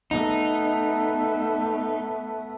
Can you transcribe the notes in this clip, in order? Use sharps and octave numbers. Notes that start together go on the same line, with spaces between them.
A3 B3 D#4